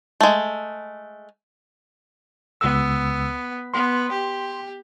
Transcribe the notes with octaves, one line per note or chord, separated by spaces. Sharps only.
G#3 A3
C#2 B3 E6
B3 C6
G4